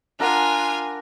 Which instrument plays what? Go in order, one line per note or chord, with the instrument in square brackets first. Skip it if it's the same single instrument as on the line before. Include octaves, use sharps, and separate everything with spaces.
[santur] D4 A#4 F#5 [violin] F4 G#5